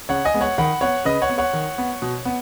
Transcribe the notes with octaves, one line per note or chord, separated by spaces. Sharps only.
C#3 C#5 F#5
D#5 G#5
G#3 B3
C#5 F#5
D#3 F#5 B5
B3 C#5 F#5
C#3 B4 D#5
C#5 F#5
B3
C#5 F#5
D#3
B3
B2
B3